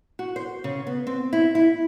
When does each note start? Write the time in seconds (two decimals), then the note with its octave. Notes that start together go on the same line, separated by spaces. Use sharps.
0.19 F#4
0.36 C5
0.64 C#3
0.87 B3
1.07 C4
1.33 E4
1.55 E4